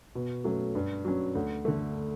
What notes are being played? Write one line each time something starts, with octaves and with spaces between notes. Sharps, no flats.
B2
F#3 A3 C#4
G2
F#3 C#4
D2
D3 A3